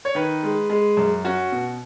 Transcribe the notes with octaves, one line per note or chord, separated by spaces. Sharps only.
C#5
D#3 B4
G#3
G#3
F#2
C#4 F#4
B2